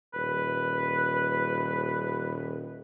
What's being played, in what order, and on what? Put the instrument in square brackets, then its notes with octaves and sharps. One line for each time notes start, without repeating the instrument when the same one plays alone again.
[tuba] D#1 [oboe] B4